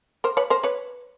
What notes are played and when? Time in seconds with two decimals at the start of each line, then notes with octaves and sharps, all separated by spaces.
0.24 A#4 C5
0.37 B4 C#5
0.50 A#4 C5
0.63 B4 C#5